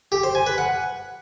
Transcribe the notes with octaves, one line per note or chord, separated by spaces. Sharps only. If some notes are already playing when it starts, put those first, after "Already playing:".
G4
C5
G#5
B4
F#5